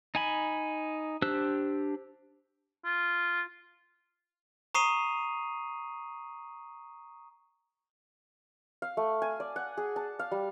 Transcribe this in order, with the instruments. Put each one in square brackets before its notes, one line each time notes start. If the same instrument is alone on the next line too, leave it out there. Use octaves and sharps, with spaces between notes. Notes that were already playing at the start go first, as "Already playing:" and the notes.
[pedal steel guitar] D#4 G#5 B5
D4 G4 C5 E6 F#6
[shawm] F4
[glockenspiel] A#5 C#6 D#6 C7 D#7 F7
[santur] F5
A3
G#5
D5
F#5
G#4
A5
F5
G3